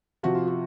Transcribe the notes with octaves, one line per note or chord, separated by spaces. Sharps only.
C3 F3 F#4
F4
F#4